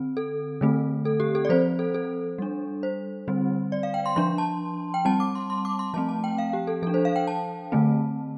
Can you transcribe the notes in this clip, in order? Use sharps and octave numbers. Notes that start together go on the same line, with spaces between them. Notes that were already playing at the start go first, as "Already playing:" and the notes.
Already playing: D3 C4
A4
D3 A3 C4
A4
G4
A4
D5
F3 C4 C5
A4
A4
G3 D4
C5
D3 G3 C4
D5
F5
G5
C6
F3 D4 C6
A5
G5
G3 C4 A5
D6
C6
C6
D6
C6
F3 A3 C4 A5
A5
G5
F5
G4
A4
F3 D4 A4
C5
F5
G5
A5
D3 A3 C4